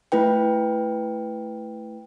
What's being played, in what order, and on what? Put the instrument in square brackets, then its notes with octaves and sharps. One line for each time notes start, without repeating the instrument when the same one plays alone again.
[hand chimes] A3 E4 B4 G5